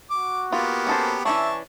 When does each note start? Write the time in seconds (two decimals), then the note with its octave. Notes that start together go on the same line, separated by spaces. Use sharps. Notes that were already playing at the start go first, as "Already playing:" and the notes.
0.10 F#4 D6
0.52 A#3 B3 F4 G4
0.87 C#4 A4 C5
1.25 E3 C#4 D4 E5 A5 C#6